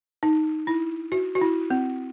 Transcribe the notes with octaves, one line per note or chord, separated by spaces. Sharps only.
D#4
E4
F#4
F#4
E4
C4